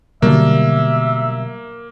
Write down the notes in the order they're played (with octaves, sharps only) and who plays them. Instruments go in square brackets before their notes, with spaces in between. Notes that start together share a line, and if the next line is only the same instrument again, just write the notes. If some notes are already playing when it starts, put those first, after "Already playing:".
[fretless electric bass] B2 G3 [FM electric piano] D3 F#3 [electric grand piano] A#3 [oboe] E5